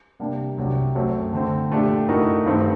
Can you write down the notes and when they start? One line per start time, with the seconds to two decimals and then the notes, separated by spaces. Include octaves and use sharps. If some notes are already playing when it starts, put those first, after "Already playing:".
0.19 C3 G3 A#3 D4
0.57 C2 C3 F#3
0.95 F#2 F#3 A3 C4
1.33 D3 A3 C4
1.70 A#2 A3 D4 G4
2.08 A2 A3 D#4 F#4 A#4
2.46 G2 D#3 A3 C4